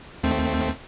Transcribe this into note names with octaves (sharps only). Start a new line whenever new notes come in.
D#2 A3 C4